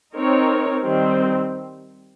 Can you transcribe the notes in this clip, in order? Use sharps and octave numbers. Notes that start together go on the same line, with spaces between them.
C4 D#4 A#4 C#5
D#3 G3 C4